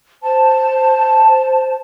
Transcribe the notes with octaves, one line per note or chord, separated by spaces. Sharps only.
C5 A5